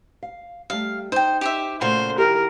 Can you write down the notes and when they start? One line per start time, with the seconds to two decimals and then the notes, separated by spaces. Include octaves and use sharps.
0.23 F5
0.70 G3 A3 F5
1.12 D#4 C5 G5
1.41 G4 C5 E5
1.81 A#2 C#3 A3 F4 F#4 C5
2.18 D#2 E4 G4 A#4